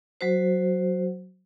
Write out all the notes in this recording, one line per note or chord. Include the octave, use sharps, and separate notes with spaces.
F#3 F#4 C5